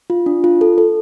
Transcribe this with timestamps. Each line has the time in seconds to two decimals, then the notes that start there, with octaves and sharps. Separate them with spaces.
0.10 F4
0.26 D4
0.44 F4
0.61 A4
0.78 A4